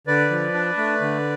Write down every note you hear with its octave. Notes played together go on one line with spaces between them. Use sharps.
D3 B4 D5
F3
D4
A3
D3